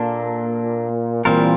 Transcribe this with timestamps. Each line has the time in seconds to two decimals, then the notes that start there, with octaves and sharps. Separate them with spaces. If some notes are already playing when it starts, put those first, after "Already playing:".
Already playing: A#2 A#3 D4 A4
1.25 A#2 E3 G3 C4 F4 A#4